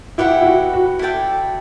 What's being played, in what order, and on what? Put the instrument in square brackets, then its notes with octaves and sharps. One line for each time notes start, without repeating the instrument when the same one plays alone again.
[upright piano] E4 [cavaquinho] G4 B4 F#5
[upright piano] E4
F#4
F#4
[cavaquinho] E4 A4 D5 G5